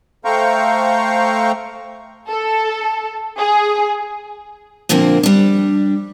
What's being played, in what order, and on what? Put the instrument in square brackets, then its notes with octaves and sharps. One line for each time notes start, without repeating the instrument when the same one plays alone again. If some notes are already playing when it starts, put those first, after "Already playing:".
[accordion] A3 C5 F5 G5 A#5 C#6
[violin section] A4
G#4
[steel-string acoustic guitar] A#2 D3 F3 A#3 C4
G3 D4